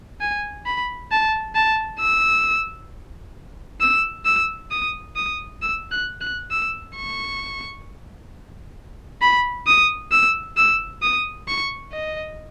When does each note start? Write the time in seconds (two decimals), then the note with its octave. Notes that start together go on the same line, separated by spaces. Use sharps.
0.21 G#5
0.66 B5
1.11 A5
1.55 A5
2.00 E6
3.81 E6
4.26 E6
4.71 D#6
5.16 D#6
5.62 E6
5.91 F#6
6.21 F#6
6.51 E6
6.96 C#6
9.22 B5
9.67 D#6
10.12 E6
10.57 E6
11.02 D#6
11.48 C#6
11.92 D#5